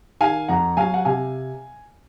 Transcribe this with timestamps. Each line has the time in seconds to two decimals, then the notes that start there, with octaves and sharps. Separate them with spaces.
0.21 D#3 F5 G#5
0.48 F2 F#5 A#5
0.77 F#3 F5 G#5
0.94 F#5
1.05 C3 F5 G#5